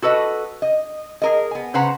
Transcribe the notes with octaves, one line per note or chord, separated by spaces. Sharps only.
F#4 A4 B4 D#5
D#5
G#4 A#4 D#5
B3 G#5
C#3 B4 C5 F#5 A#5